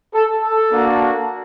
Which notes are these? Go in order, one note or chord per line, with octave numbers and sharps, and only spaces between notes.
A4
A4
A#3 D4 F#4